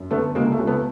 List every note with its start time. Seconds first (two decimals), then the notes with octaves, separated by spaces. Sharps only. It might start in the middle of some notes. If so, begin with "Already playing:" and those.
Already playing: F#2
0.11 D3 A3 B3
0.35 C#2 G#3 A#3
0.52 A3
0.59 C#2
0.67 A3 B3